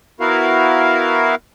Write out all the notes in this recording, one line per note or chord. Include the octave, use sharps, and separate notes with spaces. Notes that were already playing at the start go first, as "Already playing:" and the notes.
B3 E4 F#4 A#4 F5